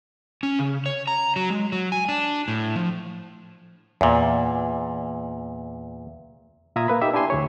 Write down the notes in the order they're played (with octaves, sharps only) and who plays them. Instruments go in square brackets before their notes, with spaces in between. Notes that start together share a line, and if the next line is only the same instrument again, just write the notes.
[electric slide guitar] C#4
C#3
C#5
A#5
F#3
G#3
F#3
G#5
D4
A2
F3
[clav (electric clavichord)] E2 A#2
[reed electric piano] A#2 F4 E5 A#5 D#6 G#6
A#3 B4 B5
D#4 G4 E5
D4 E4 G4 G#5 C6
D2 D3 C#5